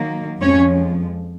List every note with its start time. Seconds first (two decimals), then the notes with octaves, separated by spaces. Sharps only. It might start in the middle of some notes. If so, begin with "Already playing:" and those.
Already playing: D#3 F#3 A#3
0.41 F2 F3 G#3 C#4 C#5